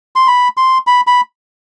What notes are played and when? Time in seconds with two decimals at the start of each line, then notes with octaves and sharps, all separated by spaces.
0.16 C6
0.27 B5
0.57 C6
0.87 B5
1.07 B5